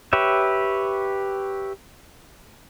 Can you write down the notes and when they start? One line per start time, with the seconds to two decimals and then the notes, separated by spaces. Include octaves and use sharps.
0.13 G4 B4 C#5 E5